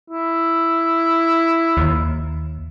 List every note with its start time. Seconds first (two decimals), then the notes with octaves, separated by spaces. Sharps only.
0.10 E4
1.77 D#2